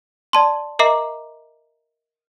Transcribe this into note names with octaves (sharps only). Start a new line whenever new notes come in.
D5 A5 C6
A#4 D#5 E5 A#5 D6 C7